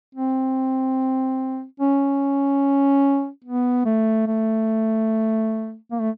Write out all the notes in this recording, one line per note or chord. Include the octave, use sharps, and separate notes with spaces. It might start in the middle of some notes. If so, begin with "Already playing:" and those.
C4
C#4
B3
A3
A3
A#3
A3